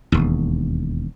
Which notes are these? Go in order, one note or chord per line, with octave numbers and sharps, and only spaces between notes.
E1 D#2